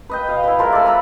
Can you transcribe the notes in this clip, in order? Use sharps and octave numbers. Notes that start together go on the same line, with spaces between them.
B4 D#5 G5
B2 F5
E4 B4
F3 G#3 A#4 B4
A4 D5
B4 E5 A#5 B5